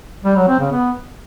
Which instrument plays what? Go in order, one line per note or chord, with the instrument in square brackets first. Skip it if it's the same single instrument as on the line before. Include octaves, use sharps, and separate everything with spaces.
[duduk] G3
F#3
C4
C#3
B3